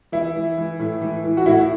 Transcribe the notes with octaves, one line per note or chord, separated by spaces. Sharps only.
E3 E4
E3
E3
A2
E3
E3
F#4
A2 E4